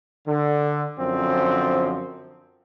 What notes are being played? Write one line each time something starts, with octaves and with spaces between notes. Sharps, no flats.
D3
F#2 D3 F3 C4